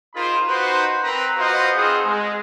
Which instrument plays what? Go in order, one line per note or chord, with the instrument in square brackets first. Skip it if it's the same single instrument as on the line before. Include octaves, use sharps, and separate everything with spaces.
[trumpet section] D#4 F4 G#4 A#4 C5 B5
D#4 F#4 B4 C5
C4 A#4 B4 A#5 C6
F4 F#4 B4 C5 D#5 F5
C4 D#4 F4 G#4 C5 F#5
G#3